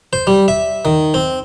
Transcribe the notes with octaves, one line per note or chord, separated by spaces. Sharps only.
C5
G3
E5
D#3
C4